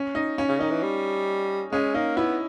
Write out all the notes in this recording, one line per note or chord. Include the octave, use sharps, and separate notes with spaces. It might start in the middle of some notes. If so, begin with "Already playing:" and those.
Already playing: C#4
D#4
C#4
C#3
D#3 D#4
E3
G3
G#3 C#4
A#3 D#4
B3 E4